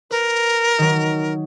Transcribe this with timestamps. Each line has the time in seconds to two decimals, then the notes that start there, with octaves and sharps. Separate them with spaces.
0.11 A#4 B4
0.78 D#3 F#3